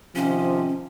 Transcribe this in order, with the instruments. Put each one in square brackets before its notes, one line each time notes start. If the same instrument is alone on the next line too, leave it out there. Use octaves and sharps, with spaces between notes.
[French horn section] C3 D#3 F3 [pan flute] C#4